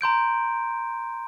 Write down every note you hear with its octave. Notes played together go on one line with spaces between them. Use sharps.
A#5 C6 G6 D7